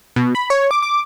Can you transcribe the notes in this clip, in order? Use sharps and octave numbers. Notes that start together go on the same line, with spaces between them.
B2
B5
C#5
D6
D6